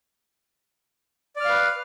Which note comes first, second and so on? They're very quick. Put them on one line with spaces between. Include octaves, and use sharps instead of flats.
D5 F6 F5 B4